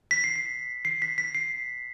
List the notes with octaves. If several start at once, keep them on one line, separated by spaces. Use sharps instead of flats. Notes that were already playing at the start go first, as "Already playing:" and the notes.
B6
C7
C7
C7
B6
B6
C7